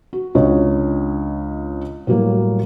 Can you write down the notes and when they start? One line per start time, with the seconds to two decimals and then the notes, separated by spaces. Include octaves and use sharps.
0.13 F#4
0.35 C#2 D4 C#5 D#5
2.07 A2 F#3 G3 A#3